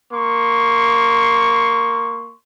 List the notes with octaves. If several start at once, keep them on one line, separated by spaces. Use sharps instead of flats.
A#3 C6 C#6